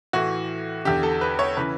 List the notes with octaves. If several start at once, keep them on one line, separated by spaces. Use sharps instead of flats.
A2 E3 F#4
E2 D3 G4
A4
B4
C#5
C#3 E3 B4